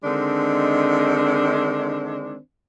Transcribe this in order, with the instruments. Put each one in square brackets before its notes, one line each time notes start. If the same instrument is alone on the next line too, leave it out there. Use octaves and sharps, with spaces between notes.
[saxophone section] D3 D#3 G#3 C4 D4